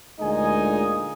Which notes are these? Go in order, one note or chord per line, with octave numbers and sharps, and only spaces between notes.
D2 A#2 G#3 D#4 D#5 G#5